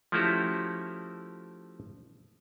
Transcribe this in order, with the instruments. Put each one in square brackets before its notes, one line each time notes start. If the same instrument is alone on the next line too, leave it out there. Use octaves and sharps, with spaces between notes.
[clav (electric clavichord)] F3 A3 C#4 E4 F#4 G4